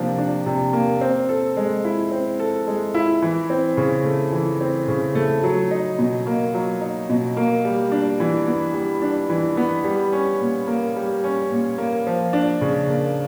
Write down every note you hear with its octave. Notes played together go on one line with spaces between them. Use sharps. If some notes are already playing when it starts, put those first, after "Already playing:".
Already playing: C3 F3 A#3 D4
D4
C3
A#3
C4
A4
G#3
E4
C4
A4
G#3
E4
E3
C4
C#3
A3
E3
C4
C#3
A3
F#3
D#4
B2
A#3
F#3
D#4
B2
A#3
G3
D4
E3
B3
G3
D4
E3
B3
G3
C#4
A#2
A#3
G3
C#4
A#2
A#3
F3
D4
C#3
A#3